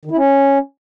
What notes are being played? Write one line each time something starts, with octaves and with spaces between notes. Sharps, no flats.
D#3
E4
C#4